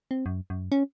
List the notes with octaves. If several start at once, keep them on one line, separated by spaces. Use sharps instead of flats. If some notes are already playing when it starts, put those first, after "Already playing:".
C4
F#2
F#2
C#4